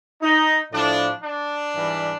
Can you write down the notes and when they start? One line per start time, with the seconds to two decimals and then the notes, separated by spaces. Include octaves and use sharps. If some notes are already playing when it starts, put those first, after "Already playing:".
0.22 D#4
0.73 A2 F3 D4
1.24 D4
1.74 G#2 E3 G3